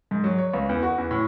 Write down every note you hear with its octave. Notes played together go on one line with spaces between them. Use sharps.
G#2
F#3
C#5
C#2
E2
F#4
E2
A2